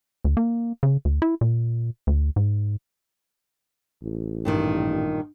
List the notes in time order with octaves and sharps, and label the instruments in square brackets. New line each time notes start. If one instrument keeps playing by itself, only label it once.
[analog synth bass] D2
A#3
C#3
D2
E4
A#2
D2
G#2
[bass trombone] A1
[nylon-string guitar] G2 A#2 D#3